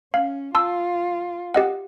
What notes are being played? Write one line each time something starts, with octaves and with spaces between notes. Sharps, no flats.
C#4 F5
F4 A5 C6 E6
G4 D#5 F#5